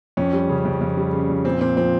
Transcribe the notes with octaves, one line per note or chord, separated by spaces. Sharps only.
F2 C#4
G3
C#3
F2
F2
G3
C#3
F2
A#2 C4
A#2 C4
F3 C4